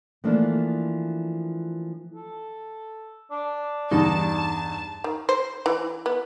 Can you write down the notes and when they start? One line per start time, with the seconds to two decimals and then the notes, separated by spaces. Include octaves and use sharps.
0.24 E3 F3 A3 A#3 D4
2.15 A4
3.31 D4
3.91 E2 G2 D#4 A5
5.04 D#3
5.29 C5
5.66 E3
6.06 B3